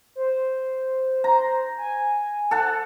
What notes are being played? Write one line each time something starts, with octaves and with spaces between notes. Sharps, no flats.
C5
C5 A#5
G#5
A4 F#5 A5